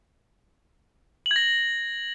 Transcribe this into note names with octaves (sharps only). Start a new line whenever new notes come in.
F#7
G#6
A#6